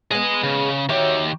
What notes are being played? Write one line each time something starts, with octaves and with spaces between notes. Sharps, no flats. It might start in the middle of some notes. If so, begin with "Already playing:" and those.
G#3 B3 G#4 D#5
C#3
D#3 F#4 G4 C#5 E5